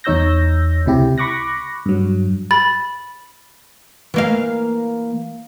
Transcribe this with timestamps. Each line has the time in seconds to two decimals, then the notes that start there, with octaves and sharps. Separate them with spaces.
0.04 E2 D#4 C#5 E6 G6 A#6
0.86 C#2 C3 E4 G4
1.18 B5 C#6 D6 F#6 A#6
1.86 G2 F#3
2.51 B5 A6
4.14 E3 A#3 F5